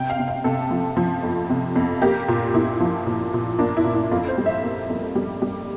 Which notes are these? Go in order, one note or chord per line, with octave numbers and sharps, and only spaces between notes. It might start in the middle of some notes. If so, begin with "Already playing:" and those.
Already playing: C3 G5
F5
C3
F5
C3 A4
F3
F3
F2
C3
F2
A#3 G4
A#2
A#2 E4
F3
A#2
A#2
A#3 D4
E4
A#2
E4
F2 F4
C5
G3
E5
A#3
F2
G3
G3